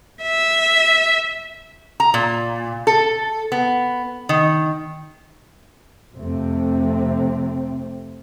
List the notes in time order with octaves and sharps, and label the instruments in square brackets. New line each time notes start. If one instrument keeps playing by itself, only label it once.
[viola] E5
[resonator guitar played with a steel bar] A#5
A#2
A4
B3
D#3
[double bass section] F2 C3 A3 C4